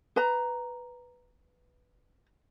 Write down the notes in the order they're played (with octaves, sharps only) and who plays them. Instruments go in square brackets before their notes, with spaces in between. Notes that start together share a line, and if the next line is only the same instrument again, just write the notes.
[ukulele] B4 A#5